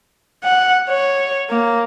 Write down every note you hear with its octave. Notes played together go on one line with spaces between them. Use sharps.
F#5
C#5
A#3